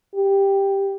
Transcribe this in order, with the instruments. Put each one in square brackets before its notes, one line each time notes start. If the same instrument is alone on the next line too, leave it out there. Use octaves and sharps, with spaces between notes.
[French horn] G4